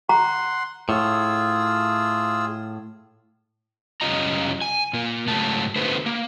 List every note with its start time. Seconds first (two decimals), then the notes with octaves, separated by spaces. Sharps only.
0.09 F#5 A#5 C6
0.89 A2 F4 G#4 E6
4.01 F#2 C#3 G3 F4 D#5 A#5
4.61 G#5
4.93 A#2 A#3
5.27 G#2 C#3 F#3 A3 A5
5.76 D3 A3 B3 F#4 B4 C5
6.06 A#3